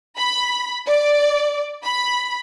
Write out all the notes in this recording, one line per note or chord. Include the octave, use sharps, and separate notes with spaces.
B5
D5
B5